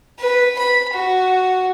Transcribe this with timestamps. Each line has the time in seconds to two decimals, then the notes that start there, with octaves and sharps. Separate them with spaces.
0.19 B4
0.59 B5
0.93 F#4